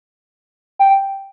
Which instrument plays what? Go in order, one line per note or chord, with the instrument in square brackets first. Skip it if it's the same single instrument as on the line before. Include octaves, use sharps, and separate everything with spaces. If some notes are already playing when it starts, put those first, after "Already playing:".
[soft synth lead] G5